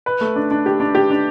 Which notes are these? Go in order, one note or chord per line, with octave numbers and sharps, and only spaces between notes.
B4
A3
D4
D4
G4
D4
G4
D4